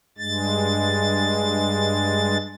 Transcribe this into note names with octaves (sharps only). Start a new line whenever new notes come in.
G2 G#3 A6